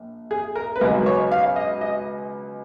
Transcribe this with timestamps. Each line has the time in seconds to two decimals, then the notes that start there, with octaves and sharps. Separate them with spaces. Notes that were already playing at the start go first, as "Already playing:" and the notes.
Already playing: A#1
0.31 G#4
0.56 A#4
0.76 B4
0.81 C#2 B2 F#3 B3 D#4 A#4
1.06 C#5
1.32 F5
1.56 D#5
1.81 D#5